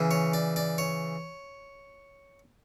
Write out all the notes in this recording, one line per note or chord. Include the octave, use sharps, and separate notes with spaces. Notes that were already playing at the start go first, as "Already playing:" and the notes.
Already playing: C#3 E3
C#5
D5
D5
C#5